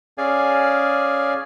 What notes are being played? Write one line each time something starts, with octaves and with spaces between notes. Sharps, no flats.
C#4 G#4 D5 F5 G#5